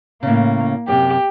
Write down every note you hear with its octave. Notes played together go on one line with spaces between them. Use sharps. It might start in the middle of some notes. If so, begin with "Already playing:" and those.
A2 C#3 A#3
F#2 C3 G4